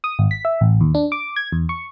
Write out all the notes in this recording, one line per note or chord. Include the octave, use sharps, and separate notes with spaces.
D#6
G#1
B6
E5
A1
D#2
D4
D6
G#6
E2
C#6